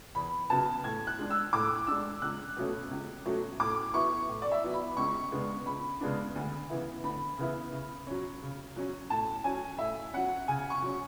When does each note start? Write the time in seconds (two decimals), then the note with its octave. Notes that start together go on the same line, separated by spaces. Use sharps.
0.15 E2 B5
0.50 C#3 F#3 B3 A5
0.84 A2 G#6
1.07 F#6
1.19 G#3 D4
1.30 E6
1.53 A2 D6
1.87 G#3 D4 E6
2.22 C#2 F#6
2.56 B2 F#3 A3 C#4
2.91 C#2
3.25 B2 F#3 A3 C#4
3.60 A2 D6
3.94 F#3 B3 E4 C#6
4.28 A2
4.42 D5
4.52 E5
4.63 F#3 B3 E4
4.74 B5
4.97 C#2 C#6
5.32 C#3 G#3 B3 D4
5.66 C#2 B5
6.01 C#3 G#3 B3 D4
6.35 D2
6.69 C#3 E3 B3 E4
7.04 D2 B5
7.38 C#3 E3 B3 E4
7.72 C#3
8.07 F#3 C#4
8.42 C#3
8.76 F#3 C#4
9.10 A2 A5
9.44 F#3 C#4 G#5
9.78 A2 E5
10.14 F#3 C#4 F#5
10.48 C#3 G#5
10.70 C#6
10.82 F#3 C#4